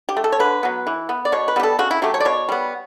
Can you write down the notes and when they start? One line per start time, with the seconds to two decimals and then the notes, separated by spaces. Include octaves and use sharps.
0.09 G4
0.17 A3
0.24 A4
0.32 C#5
0.39 D3 B4
0.63 F#3 B3
0.87 E3
1.09 B3
1.25 D5
1.32 B2 C#5
1.48 B4
1.56 G3 B3 G4
1.63 A4
1.79 C#3 F#4
1.91 E4
2.02 F#3 A3 G4
2.14 C#5
2.20 D5
2.25 B2 C#5
2.49 G3 B3